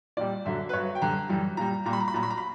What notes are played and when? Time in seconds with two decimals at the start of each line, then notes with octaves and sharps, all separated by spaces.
0.17 A#2 G3 D5
0.45 F#2 D3 F#3 E5
0.69 B4
0.73 G2 F#3 C#5
0.95 G5
1.01 F#2 D3 G3 A#5
1.29 F#2 E3 G3
1.57 A#2 G3 A#5
1.86 A#2 G3 A#5
1.93 B5
2.00 A#5
2.08 B5
2.14 A#2 F#3 A#5
2.23 B5
2.30 A#5
2.38 B5